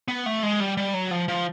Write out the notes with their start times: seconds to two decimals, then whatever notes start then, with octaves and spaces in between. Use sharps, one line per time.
0.08 B3
0.26 A3
0.43 G#3
0.60 G3
0.77 G3
0.94 F#3
1.11 F3
1.28 F3